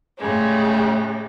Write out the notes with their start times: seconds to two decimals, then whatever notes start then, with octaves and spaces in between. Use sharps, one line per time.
0.18 A2 C#3 G3 G#3